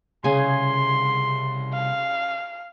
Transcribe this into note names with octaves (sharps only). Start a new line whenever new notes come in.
C2 C#3 G#4 G#5 C6
F5